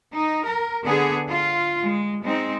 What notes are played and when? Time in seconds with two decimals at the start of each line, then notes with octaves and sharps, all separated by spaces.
0.12 D#4
0.44 A#4
0.84 D3 B3 G#4
1.29 F4
1.81 G#3
2.23 G#3 C4 D#4